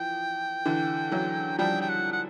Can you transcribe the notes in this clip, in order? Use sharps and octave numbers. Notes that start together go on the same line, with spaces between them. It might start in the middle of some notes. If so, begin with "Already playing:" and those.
Already playing: E3 F3 G5
D3 E3
E3 F#3
F3 G3 G5
G5
F#5
F#5